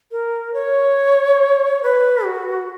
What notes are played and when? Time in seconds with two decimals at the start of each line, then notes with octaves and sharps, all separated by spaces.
0.11 A#4
0.54 C#5
1.83 B4
2.25 F#4